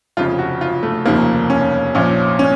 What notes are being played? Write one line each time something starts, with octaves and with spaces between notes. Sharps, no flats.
F1 F2 C#3 F4
F#4
F4
A3
F1 D#2 C#3 F3 A#3
C#4
A#1 A#2 F3 C#4
C#4